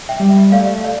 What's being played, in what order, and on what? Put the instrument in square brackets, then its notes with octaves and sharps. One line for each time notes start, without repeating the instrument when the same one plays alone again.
[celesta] E5 G5
[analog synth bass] G3
[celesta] E5
[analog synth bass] A3 [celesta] D5 F5
[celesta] D5 F5